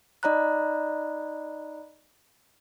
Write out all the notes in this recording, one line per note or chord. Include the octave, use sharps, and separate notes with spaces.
D#4 D5 D#5 A#5 B5 F#6